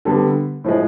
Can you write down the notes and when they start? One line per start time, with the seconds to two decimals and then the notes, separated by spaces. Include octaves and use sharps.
0.05 D3 G3 B3
0.64 A2 F3 G#3